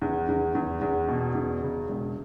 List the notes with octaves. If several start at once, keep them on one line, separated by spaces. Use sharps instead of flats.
E2
E2
E2
E2
B2
E2
C#3
E1